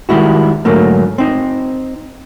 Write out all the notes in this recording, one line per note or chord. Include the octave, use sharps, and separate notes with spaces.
D#3 G3 G#3 E4 F#4
G#2 D3 F#3 A3 A#3
C4 D#4